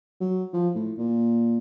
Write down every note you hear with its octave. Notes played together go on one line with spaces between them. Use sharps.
F#3
F3
A2
A#2